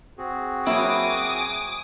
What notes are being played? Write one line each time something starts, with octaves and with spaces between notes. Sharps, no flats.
C4 F#4 G#4
F#3 A#3 E4 C#5 G#5 D6 D#6